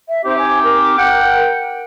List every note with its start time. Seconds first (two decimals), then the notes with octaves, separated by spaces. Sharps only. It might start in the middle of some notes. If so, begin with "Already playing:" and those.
0.08 E5
0.25 C4 D#4 G4 C5
0.37 G#5
0.62 A#4
0.98 F#5 G5